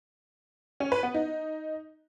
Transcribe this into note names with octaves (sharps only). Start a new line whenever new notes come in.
C#4
B4
B3
D#4